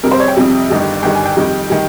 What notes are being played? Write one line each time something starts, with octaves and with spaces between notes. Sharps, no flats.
F2 C3 G3 A#4
C5
C#5
G5
F2 C3 G3
G1 G2 D#3 G3
G1 G2 D#3 G3 G5
G#5
G5
F2 D#3 G3
D#3 G3